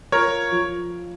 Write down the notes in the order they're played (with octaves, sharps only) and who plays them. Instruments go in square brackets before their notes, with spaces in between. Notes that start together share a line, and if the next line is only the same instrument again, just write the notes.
[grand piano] F4 [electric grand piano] A#4 C#5
[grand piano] F3